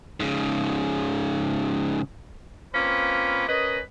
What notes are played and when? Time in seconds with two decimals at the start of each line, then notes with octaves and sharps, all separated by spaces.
0.20 G#2 C#3
2.74 A#3 C4 C#4 F4 B4
3.48 C#4 A#4 B4 D#5